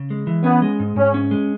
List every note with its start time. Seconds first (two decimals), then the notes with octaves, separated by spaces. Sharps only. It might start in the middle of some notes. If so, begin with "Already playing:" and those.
Already playing: C#3
0.10 G#3
0.27 E3
0.44 B3 C#4
0.62 G#3
0.80 G#2
0.96 G#2 C#4
1.14 C#4
1.31 G#3